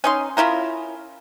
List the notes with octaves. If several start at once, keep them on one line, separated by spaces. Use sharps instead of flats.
C#4 D#4 C6
C#4 E4 F4 A#4